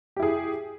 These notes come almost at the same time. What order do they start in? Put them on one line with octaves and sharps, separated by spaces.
G4 E4 G#4